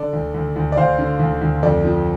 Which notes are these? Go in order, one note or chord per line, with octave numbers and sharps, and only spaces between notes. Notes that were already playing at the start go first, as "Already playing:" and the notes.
Already playing: D3 A4 D5
D2
D2
D2
D5
D2 C5 F5
D3
D2
D2
F2 A4 D5
F3